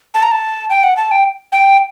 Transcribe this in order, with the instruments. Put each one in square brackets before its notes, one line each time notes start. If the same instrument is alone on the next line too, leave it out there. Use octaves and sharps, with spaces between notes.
[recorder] A5
A#5
A5
G5
F#5
A5
G5
G5